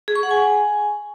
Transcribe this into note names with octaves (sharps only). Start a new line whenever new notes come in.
G#4
C#6
F#5
G#5